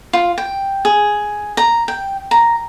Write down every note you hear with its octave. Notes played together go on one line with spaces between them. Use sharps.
F4
G5
G#4
A#5
G5
A#5